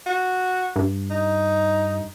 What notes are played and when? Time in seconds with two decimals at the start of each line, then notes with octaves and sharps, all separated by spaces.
0.06 F#4
0.76 G2
1.10 D#4